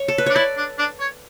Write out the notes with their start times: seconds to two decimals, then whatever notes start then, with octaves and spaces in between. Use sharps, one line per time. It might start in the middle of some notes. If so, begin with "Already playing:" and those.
Already playing: C#5
0.08 A4
0.18 B4
0.26 D4 C#5
0.36 E4 D5
0.57 D4
0.78 D4
0.99 C#5